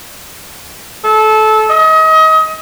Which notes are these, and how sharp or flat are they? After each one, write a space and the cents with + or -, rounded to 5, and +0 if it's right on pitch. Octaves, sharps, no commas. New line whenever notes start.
A4 -20
D#5 +30